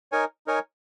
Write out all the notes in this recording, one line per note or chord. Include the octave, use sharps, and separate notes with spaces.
D#4 A#4 C#5 G#5
D#4 A#4 C#5 G#5